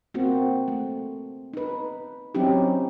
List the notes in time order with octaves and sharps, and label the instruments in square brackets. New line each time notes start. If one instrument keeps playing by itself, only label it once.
[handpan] A#3 C4 F#4
A3
D#4 B4
F#3 C4 C#4 D#4 E4 G4